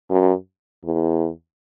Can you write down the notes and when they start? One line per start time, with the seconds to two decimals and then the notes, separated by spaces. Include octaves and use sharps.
0.10 F#2
0.84 E2